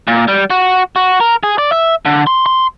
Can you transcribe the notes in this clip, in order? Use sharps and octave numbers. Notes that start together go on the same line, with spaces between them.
A#2
G3
F#4
F#4
A#4
G#4
D5
E5
D3
C6
C6